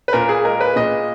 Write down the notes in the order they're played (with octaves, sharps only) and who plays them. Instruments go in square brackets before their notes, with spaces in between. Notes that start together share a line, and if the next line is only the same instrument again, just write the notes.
[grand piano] B4
A#2 A#4
G#4
G#3 A#4
B4
A#2 D#5